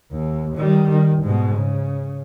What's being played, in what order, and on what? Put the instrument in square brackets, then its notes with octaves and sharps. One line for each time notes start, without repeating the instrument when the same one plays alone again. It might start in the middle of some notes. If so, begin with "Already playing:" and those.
[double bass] D#2
D#3 G3
D#3
G#2 B2
C#3